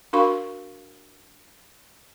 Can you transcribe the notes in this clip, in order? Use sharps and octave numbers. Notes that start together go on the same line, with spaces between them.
D4 F#4 A#4 F5 B5 C#6